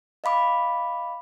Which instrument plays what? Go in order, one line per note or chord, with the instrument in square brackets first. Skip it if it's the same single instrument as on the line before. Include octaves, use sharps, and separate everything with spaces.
[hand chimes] D#5 F5 B5 D6